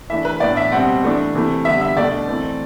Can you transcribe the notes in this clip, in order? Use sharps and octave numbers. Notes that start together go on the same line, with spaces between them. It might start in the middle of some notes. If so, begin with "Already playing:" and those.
E3 A3 D4 E5
B4
A2 E3 B3 D4 D5
E5
B2 G3 C4 F#5
E3 A3 D4
C3 E3 A3
D3 G3 B3 E5
E5
B2 A3 D4 D5
E3 A3 C4